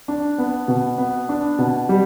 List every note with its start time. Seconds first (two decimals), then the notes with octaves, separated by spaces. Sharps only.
0.08 D4
0.38 B3
0.68 B2
0.98 B3
1.29 D4
1.58 B2
1.89 G3